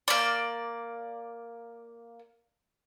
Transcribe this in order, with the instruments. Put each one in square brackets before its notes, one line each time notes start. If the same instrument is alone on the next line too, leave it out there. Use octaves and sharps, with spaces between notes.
[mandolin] A#3 D5